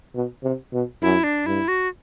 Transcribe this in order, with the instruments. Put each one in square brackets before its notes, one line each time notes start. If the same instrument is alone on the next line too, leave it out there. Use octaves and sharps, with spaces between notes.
[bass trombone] B2
C3
B2
[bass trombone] F#2 [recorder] E4
[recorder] D4
[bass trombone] G2 [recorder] E4
[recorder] F#4